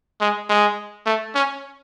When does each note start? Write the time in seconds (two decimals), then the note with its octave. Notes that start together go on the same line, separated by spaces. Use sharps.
0.21 G#3
0.49 G#3
1.06 A3
1.35 C#4